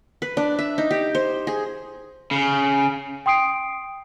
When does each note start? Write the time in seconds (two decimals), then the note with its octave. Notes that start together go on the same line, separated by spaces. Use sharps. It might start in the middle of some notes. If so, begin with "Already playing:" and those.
0.22 B4
0.37 D4
0.59 E5
0.78 D#4
0.91 G4
1.15 C5
1.47 G#4
2.31 C#3
3.26 G5 C6 D#6 C7 D7